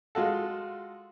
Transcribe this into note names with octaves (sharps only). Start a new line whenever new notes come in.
G#3 F4 F#4 A4